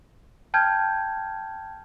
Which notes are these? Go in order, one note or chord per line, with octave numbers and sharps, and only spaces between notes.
G5 A5 F6 G6 G#6